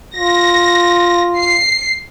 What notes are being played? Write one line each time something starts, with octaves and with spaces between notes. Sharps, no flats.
F4 A#6
C7